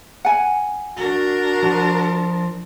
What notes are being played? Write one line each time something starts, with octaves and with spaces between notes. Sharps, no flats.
F#5 G#5
D4 F#4 A#4
F3